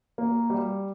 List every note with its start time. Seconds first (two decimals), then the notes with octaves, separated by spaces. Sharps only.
0.18 A#3
0.50 G3